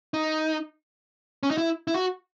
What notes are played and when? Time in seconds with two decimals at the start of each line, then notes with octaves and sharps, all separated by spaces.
0.14 D#4
1.43 C#4
1.51 D#4
1.58 E4
1.88 E4
1.94 F#4